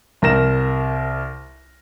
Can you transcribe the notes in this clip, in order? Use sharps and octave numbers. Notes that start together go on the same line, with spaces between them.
C2 A#4 A#6 E7